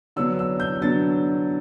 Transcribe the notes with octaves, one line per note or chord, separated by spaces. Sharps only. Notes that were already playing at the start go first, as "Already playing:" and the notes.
D3 F#3 B3 D4 E6
E6
G6
D3 F#3 B3 D4 A6